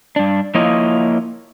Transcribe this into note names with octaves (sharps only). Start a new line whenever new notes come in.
G2 D4
F3 A#3 E4 F4 C#5 D#5